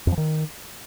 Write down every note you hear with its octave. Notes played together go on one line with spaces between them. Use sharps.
F2
F3
D#3